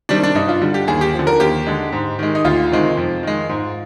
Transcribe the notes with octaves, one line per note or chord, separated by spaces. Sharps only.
C3 D#3 G3 D4
D4
G2 D#4
F4
D3 G3
G4
D#2 G#4
G4
F3
D3
A#4
D#2 G4
D3 G#3
G#2
D#3 G#3
D#4
D2 F4
C3 D#3 G#3
F2
D#3 G#3
G#2